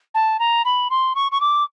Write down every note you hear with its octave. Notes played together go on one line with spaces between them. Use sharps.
A5
A#5
B5
C6
C#6
C#6
D6